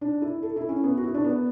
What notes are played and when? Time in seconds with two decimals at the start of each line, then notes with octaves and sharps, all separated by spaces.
0.01 D4
0.22 E4
0.43 A4
0.56 E4
0.69 C#4
0.84 B3
0.97 F#4
1.04 E4
1.14 D4
1.24 B3